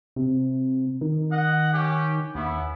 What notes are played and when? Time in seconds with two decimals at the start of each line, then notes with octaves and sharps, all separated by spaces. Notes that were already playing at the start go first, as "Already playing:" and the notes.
0.16 C3
1.01 D#3
1.32 D#5 F#5
1.73 C#4 G4
2.35 D#2 B3 C#4 E4